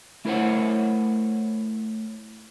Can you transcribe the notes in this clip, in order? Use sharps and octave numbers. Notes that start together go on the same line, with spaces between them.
A3 E4 A#4 C5 C#5 F#5